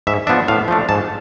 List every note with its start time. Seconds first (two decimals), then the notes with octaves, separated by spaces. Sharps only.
0.07 G#2 E5
0.27 F3 B3 D4 E5
0.48 A2 F5
0.68 F3 A3 D4
0.89 G#2 A5